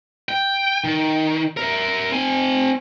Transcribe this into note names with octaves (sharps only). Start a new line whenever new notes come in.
G5
D#3
A#4 E5
C4 G#5